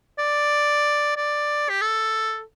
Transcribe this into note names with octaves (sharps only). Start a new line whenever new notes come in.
D5
D5
G4
A4